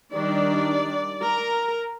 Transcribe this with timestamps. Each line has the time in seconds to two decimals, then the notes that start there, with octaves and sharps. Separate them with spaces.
0.13 D#3 G3 D4 D5
1.22 A#4